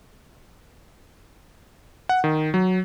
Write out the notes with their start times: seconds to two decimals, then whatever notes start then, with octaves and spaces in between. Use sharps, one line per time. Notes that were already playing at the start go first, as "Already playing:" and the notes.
2.09 F#5
2.24 D#3
2.54 F#3